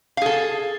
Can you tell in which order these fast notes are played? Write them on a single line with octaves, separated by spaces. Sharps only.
F5 G#4 A4